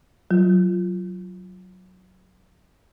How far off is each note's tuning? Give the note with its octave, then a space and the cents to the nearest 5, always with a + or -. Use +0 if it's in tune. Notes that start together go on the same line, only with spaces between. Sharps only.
F#3 +0 F4 -10